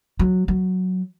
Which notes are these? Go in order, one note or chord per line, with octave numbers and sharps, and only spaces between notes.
F#3
F#3